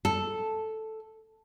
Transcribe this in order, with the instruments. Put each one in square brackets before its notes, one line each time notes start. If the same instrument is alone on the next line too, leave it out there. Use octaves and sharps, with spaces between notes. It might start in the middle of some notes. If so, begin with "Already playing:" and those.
[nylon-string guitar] A4